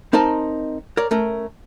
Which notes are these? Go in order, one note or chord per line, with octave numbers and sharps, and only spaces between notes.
C4 D#4 A#4 D#5 A5
A#4 C#5 D5
A3 C#4 A#4